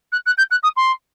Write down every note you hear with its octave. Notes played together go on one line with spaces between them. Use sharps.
F#6
F#6
G6
F#6
D#6
C6